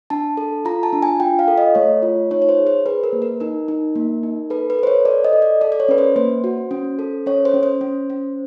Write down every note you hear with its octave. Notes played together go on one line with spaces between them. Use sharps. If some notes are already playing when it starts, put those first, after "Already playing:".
D4 A5
A4
F4 A#5
A5
D4
G#5
F4 G5
F5
A4
D#5
A3 C#5
F4
D#4 C#5
C#5
C5
G#4
C5
G#4 B4
A#4
A#3
A#4
D#4 A#4
D#4
A#3
D#4
A4 B4
B4
A4 C5
C#5
A4 D5
D#5
A4
D5
A4 D5
D5
C#5
C#4 B4
C5
A#3 C5
F#4
C#4
A4
C#4 C#5
C5
C#4
C5
C#4
C#4